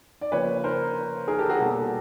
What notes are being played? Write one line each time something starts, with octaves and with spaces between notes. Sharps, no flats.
D5
C#3 F3 A#3 B4 C#5
A#4 C5
G#4 A#4
G4 A4
F#4 G#4
B2 G3 A#3 G4 A4